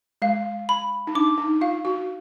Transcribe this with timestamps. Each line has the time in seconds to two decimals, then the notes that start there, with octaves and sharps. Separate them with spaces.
0.22 G#3 F5
0.69 B5
1.07 D#4
1.15 D4 D6
1.38 D#4
1.61 F4 F5
1.85 F#4